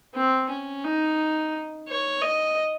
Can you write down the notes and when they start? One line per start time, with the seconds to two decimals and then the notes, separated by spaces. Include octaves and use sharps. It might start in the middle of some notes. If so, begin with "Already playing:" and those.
0.15 C4
0.50 C#4
0.84 D#4
1.88 C#5
2.22 D#5